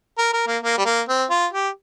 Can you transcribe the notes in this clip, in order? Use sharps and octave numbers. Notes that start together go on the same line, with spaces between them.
A#4
A#4
A#3
A#3
G3
A#3
C4
F4
G4